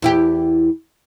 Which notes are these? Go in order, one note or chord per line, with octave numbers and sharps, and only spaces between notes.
E2 E4 G4